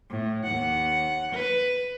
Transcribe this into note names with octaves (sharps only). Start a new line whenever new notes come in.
A2
D#2 F#5
B4